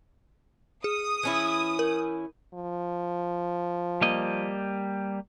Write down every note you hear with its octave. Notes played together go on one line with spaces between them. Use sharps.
G#4 D#6
E3 C#4 E4
A#4
F3
G3 A#3 D#5